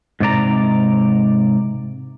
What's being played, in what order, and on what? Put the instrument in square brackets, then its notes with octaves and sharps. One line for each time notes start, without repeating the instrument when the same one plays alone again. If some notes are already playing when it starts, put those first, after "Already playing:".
[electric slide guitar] G#2 C3 D5 A#5